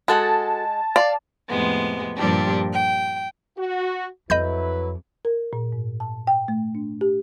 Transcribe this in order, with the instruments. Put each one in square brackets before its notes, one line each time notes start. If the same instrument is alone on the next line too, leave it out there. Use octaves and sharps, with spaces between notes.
[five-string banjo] G#3 [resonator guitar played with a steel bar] F#4 A4 F#5 [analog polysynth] A5
[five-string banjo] D5 [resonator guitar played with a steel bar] F5
[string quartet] F2 A2 C3 G#3 B3
G2 A#2 F3 G3 D4 G4
G5
[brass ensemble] F#4
[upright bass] F2 [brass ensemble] F#3 E4 B4 [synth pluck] D#5 B5 G6
[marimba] A#4
A#2
G#2
A5
G5
A3
D4
G4